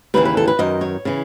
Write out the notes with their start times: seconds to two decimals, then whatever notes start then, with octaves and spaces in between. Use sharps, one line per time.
0.14 D#2 C#3 E3 B4
0.25 B4
0.37 A4
0.48 B4
0.59 F#2 D#3 D#5
0.81 C#5
1.05 C#3 E3